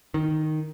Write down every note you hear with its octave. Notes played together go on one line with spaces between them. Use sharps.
D#3